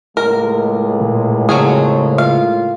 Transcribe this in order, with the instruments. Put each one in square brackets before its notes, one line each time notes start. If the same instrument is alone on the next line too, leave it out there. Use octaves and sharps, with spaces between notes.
[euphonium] C#2 [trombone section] A2 G#3 A#3 [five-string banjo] A#4
[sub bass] A#2
[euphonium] F2 [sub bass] C#3 [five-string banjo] F#3 C#4 G#4
[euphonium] F4 [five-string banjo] F5